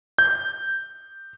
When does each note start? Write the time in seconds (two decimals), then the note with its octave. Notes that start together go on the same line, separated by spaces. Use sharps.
0.18 G6